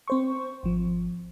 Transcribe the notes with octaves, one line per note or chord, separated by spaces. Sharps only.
C4 C5 C#6
G#1 F3